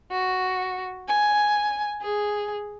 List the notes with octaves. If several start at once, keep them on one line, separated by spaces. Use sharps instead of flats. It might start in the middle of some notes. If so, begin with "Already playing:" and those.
F#4
G#5
G#4